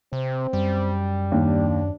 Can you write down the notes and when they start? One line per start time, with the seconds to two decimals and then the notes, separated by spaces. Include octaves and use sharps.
0.13 C3 C4
0.53 F#2 G3
1.32 D#2 D4